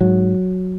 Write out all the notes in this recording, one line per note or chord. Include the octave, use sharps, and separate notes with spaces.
G#2 F#3